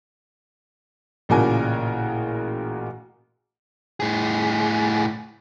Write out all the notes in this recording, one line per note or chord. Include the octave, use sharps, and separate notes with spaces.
A1 A#2 C#3 F#4 A#4 G#5
A2 G#4